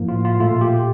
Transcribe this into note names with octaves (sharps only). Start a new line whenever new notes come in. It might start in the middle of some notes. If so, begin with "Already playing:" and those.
Already playing: A2 F3 A#3
F4
F4
A#2 A3 F4
G4